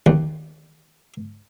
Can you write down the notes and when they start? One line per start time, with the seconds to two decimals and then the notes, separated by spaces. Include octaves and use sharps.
0.06 D#2